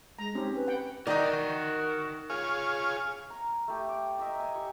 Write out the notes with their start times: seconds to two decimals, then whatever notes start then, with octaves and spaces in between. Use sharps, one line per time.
0.19 G#3 A#5
0.35 C4 C#4 D#4 G4
0.55 B4
0.68 F#5 G5
1.07 D#3 D#4 F#4 A#4 D5 D#5 G5
2.30 F4 G#4 C#5
3.30 A#5
3.68 A3 G4
3.89 D6
4.19 D#5 E5 A#5 D6
4.40 G#5
4.55 G4 C#5